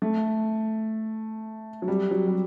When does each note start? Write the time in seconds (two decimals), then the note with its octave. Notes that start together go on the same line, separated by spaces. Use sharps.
0.02 A3
1.82 F#3
1.88 G3
2.11 F#3
2.27 G3